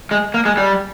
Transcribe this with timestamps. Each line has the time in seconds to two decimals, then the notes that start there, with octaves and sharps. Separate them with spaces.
0.11 G#3
0.34 A#3
0.45 G#3
0.57 G3